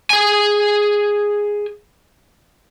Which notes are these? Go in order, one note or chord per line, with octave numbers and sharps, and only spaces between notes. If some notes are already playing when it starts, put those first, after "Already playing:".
G#4 G#5